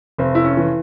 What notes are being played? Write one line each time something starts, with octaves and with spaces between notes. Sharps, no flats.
F1 C4
E4
C#4
E3